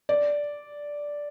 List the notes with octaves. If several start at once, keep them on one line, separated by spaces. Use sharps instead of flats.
D5